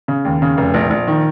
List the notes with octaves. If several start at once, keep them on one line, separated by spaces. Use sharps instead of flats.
C#3
D#2
C#3
F1
A#1
A#1
D#3